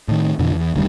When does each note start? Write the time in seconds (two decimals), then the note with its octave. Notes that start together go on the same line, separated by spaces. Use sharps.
0.08 A2 D#3
0.39 F2 B2 D3 E3
0.53 E2
0.74 F1 D2 D#3 G3